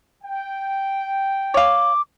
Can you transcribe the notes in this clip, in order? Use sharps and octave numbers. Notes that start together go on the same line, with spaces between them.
G5
C#5 F5 D6